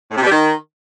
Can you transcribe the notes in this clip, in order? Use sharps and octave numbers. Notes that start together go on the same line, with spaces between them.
A2
C3
B2
G3
D#3